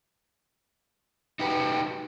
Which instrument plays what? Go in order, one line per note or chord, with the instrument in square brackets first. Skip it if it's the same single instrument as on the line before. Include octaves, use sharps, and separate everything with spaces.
[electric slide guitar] D#4 F#4 G4 B4